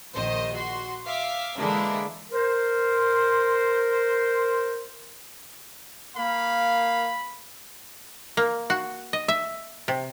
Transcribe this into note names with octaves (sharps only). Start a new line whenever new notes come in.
A#1 D#3 C5 D#5
F#4 C6
E5 F5 D6
D3 E3 G#3 A#3 D4 E4
A#4 C5
A#3 F5 B5
A#3
F#4
D#5
E5
C3